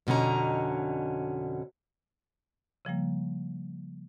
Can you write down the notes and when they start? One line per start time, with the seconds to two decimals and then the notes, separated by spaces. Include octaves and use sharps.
0.07 F2 B2 D3 C#4 A#5
2.85 C#3 F3 G3 A#3